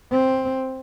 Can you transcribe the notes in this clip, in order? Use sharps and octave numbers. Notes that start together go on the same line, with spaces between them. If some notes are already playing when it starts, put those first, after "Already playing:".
C4